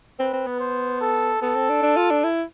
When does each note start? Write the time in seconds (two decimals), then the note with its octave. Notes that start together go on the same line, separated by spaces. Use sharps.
0.20 C4 B4
0.33 C4
0.47 B3
0.60 C5
1.01 A4
1.42 B3 A4
1.56 C4
1.69 D4
1.83 D4
1.97 F4
2.11 D4
2.24 E4